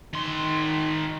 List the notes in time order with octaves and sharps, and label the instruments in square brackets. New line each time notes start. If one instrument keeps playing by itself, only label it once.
[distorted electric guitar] D#3 C6